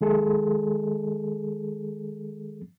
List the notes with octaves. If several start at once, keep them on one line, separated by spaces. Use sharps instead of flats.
D#3 G#3 G#4 A4